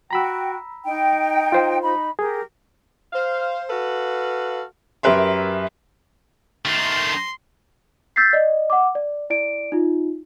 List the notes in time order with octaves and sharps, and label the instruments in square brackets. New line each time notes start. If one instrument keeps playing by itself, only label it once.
[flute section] F#4 G5 [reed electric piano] A#5 B5 E6
[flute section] D#4 G5
[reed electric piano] F4 C5
[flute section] D#4 B5
[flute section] G4 A#4 [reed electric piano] G#4
[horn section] C5 F5
F#4 A4 B4 F5
[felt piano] F#2 G4 A#4 B4 E5 C6
[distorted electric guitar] D#3 A3 [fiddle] C6
[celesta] E6 G6 A6 B6 C7
D5 D#5
F#5 D6
D5
E4 D5 D7
D#4 F4